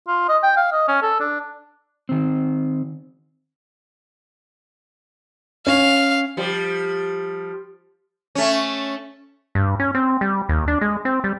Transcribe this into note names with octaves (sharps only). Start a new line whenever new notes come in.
F4
D#5
G5
F5
D#5
C#4
A4
D4
D#3 C4
C#4 F5
F3 G3
A3 C#4
G2
C#4
C4
G3
D#2
D4
G#3
C4
G3